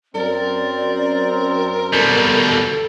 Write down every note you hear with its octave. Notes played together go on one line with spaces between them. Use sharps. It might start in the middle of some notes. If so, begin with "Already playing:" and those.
F#2 C4 A#4 D5
B2 G3 A4